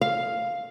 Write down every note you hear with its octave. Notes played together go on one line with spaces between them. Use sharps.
F5